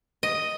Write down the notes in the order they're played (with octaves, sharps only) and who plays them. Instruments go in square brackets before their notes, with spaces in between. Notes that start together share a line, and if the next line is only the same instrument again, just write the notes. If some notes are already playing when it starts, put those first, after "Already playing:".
[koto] D#5